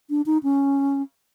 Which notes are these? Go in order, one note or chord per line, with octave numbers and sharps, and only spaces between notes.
D4
D#4
C#4